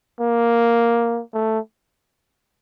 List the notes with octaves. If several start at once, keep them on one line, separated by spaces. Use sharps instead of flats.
A#3
A3